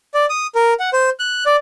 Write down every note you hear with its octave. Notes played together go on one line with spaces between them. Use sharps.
D5
D#6
A#4
F#5
C5
F#6
D5